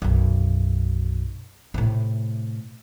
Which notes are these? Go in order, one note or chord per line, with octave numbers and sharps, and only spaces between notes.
B1 F#2
A2 C3